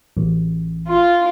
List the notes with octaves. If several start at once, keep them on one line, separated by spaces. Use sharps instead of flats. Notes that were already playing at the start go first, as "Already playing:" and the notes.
A1
F4